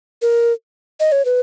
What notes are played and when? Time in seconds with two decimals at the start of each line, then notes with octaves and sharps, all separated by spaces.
0.22 A#4
1.00 D#5
1.12 C#5
1.25 B4